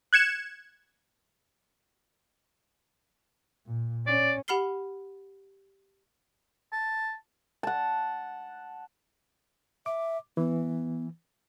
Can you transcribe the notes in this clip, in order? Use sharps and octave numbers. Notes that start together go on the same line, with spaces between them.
F#6 G#6 C#7 E7
A#2
C#4 D5
G4 F#5 B5 F6 C7 G7
A5
F#5 A5
E5 D6
E3 B3